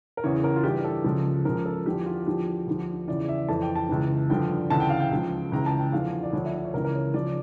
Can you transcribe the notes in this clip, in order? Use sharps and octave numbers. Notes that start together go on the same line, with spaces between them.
A#4
E2 C#3 E3 C#5
A#4
F4
G2 E3 G4
A4
C#2 C#3 F3
C#2 C#3 F3 A#4
A4
E2 D3 F3 G4
F4
E2 D3 F3 G4
D2 D3 F3
E2 C#3 E3 D5
E5
F2 E3 A5
G5
A5
C#2 C#3 E3
G2 D3 F3 G5
D2 C#3 E3 A5
G5
F5
G5
C#2 C#3 F3
C#2 C#3 E3 A#5
A5
G5
E2 D3 F3 F5
D5
D2 D3 F3 C#5
E5
D5
C#5
C#2 C#3 E3 A#4
A#4
C#5
C#3 F3 D5